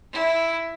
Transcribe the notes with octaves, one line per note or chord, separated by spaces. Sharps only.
E4